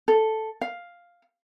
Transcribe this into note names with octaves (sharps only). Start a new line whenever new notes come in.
A4
F5